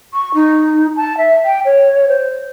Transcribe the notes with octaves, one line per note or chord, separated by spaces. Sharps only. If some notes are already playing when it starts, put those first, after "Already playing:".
C#6
D#4
A5
E5
G5
C#5
C5